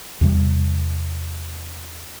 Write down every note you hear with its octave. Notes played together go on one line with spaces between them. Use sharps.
E2 C3 G3